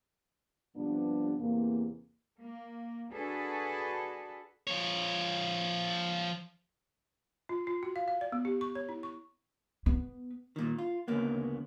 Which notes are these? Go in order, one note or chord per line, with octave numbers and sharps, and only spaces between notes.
G2 C3 F3 B3 D4
E2 C3 A#3
A#3
D4 F#4 G#4 A4 B4
F3 C#5
F4
F4
F#4
F5
F5
D5
B3
G4
C#6
C#5
E4
C#6
B3
A#2 D#3
F4
D2 C#3 A#3 B3